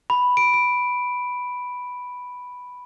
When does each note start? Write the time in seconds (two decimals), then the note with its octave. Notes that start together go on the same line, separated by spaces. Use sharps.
0.10 B5
0.37 D7
0.54 D7